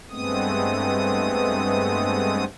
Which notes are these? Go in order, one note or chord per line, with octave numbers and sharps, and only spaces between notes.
G2 G#3 A3 B3 C4 D#6